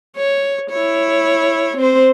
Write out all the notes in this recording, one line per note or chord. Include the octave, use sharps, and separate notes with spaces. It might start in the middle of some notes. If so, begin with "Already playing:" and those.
C#5
E4 C#5
C4 C5